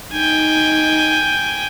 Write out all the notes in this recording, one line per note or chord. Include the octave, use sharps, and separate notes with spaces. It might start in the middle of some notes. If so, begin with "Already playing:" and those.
D#4 G5 G#5